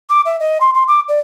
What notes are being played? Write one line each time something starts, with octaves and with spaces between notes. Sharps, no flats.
D6
E5
D#5
C6
C6
D6
D5